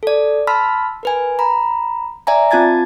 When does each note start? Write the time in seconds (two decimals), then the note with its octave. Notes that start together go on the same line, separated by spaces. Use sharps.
0.03 A4 D5
0.47 A5 B5 C6 E6 F6 B6
1.03 A#4 B4 G#5
1.39 A#5 B5
2.27 D5 E5 G#5 A#5
2.51 C4 F4 A5 G#6 A6